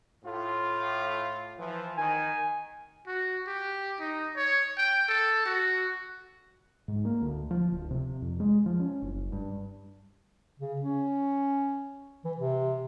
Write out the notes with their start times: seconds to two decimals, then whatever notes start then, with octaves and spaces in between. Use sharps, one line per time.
0.24 A2 F4
1.59 E3 F3
1.97 D#3 G#5
3.07 F#4
3.47 G4
4.00 D#4
4.36 C#5
4.78 G5
5.09 A4
5.46 F#4
6.88 G#2
7.05 A#3
7.22 D2
7.51 F3
7.72 D1
7.91 C3
8.22 F2
8.40 G#3
8.66 F3
8.80 C#4
9.02 F#1
9.32 G2
10.59 C#3
10.81 C#4
12.25 E3
12.37 C3